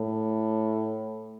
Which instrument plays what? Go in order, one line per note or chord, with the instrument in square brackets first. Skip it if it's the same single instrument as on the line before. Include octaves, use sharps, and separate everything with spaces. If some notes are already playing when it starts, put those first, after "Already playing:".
Already playing: [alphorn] A2